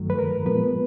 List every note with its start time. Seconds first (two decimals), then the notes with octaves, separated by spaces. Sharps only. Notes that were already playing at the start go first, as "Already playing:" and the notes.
Already playing: G2 D#3 F#3 A3
0.10 B4
0.19 A#4
0.46 A#2 F3 G#3 B3 B4